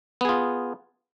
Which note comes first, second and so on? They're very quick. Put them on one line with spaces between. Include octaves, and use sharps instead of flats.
B3 G#4 F4